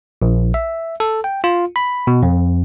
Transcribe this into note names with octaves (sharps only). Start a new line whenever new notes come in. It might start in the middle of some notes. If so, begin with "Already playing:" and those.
A#1
E5
A4
G5
F4
B5
B2
F2